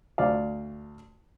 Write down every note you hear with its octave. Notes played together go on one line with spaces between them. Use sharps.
D2 D5 F5